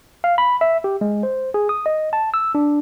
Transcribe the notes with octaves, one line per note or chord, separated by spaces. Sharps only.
F5
B5
E5
G4
G#3
C5
G#4
D#6
D#5
A5
E6
D4